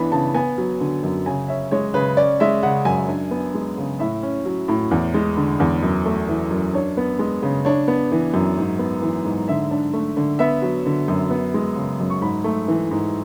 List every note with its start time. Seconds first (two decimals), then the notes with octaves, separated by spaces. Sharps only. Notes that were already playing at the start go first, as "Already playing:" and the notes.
Already playing: E3 B3 D4 B5
0.12 C#3 A5
0.34 B3 G#5
0.58 F#3
0.80 D3
1.03 F#2
1.26 C#3 G#5
1.48 C#4 E5
1.71 G#3 C#5
1.94 C#3 B4
2.17 C#4 D5
2.40 G#3 E5
2.63 C#3 F#5
2.85 F#2 G#5
3.09 D4
3.31 B3
3.54 G#3
3.78 C#3
4.00 A2 E5
4.23 C#4
4.45 F#3
4.68 A2
4.91 E2
5.14 G#3
5.37 D3
5.60 E2
5.83 F#2
6.06 A3
6.28 E3
6.51 F#2
6.74 D4 C#5
6.97 B3
7.19 G#3
7.43 C#3
7.65 D4 C#5
7.88 B3
8.12 E3
8.34 F#2
8.57 G#2
8.79 B3
9.02 E3
9.25 G#2
9.48 D3 E5
9.71 D4
9.93 A3
10.17 D3
10.39 B3 E5
10.62 F#3
10.86 D3
11.08 F#2
11.30 B3
11.54 G#3
11.76 C#3
12.00 F#2
12.10 C#6
12.21 G#2 B5
12.44 A3
12.68 E3
12.91 G#2